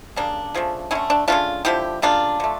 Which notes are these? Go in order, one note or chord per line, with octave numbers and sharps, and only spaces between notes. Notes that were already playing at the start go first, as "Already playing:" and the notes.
C#3 G3 A#3 D4
C#3 F3 A3
D3 A3 C#4 E4
D4
C#3 F3 A3 D4 F4
D3 F3 A3 E4 G4
C#3 G3 A#3 D4 F4
D3 A3